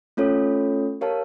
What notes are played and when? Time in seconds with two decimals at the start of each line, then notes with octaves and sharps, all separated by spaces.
0.17 A3 C#4 F4 A4 C#5
1.01 G4 A#4 C#5 F5 A5